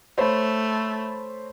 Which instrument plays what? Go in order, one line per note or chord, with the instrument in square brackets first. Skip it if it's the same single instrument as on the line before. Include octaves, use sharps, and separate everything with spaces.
[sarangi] A3 [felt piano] C5 C#5 B5